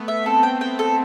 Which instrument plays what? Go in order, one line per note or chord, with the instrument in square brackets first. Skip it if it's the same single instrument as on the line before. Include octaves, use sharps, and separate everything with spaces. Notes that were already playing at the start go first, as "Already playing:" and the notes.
Already playing: [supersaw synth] A3 B3
[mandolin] E5
[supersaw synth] C4 [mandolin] A4
[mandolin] G5
[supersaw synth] C4 [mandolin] G5
[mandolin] A4